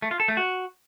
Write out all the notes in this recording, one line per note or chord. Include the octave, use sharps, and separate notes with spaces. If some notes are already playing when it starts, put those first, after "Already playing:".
A3
F4
A4
A3
F#4